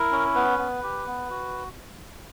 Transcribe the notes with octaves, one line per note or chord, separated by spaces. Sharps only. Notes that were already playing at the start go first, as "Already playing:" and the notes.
Already playing: E4 A#4
C#4
B3 B4
B3
G4
B3
F#4